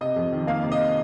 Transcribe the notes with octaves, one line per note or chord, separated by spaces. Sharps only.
C3 D#5
F2
D#3
A#3 F5
C3
D#5